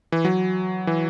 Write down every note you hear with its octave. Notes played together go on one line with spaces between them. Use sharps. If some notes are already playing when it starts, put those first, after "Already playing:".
E3
F#3
E3